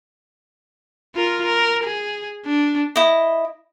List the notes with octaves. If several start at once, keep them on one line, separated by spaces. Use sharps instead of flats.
F4 A#4
A#4
G#4
D4
E4 D#5